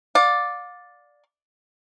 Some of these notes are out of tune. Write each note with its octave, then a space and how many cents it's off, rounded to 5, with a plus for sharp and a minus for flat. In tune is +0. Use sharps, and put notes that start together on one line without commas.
D5 +0 F5 +35